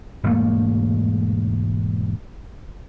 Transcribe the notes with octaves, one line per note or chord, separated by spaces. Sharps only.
E1 G#2 A3 A#3